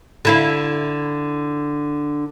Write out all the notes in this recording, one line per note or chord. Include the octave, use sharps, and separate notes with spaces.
D3 E4 F5